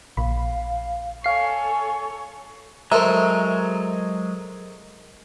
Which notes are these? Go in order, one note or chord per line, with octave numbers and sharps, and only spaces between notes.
A#1 F5 B5
A4 C#5 F5 G#5 C7
F#3 G#3 A4 A#4 C5 E5 A#5